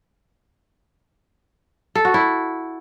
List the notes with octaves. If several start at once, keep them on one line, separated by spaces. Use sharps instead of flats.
A4
F#4
E4